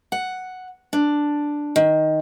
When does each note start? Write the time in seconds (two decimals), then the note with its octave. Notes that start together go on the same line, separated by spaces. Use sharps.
0.12 F#5
0.93 D4
1.76 D#3